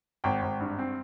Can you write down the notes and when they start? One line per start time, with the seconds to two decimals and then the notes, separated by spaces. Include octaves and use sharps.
0.24 G#1 G5
0.42 G#1
0.60 G2
0.79 C4